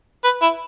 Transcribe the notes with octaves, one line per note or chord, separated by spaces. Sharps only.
B4
E4